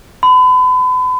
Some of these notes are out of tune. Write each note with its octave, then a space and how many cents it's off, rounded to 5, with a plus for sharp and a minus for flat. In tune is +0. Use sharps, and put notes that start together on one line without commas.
B5 +40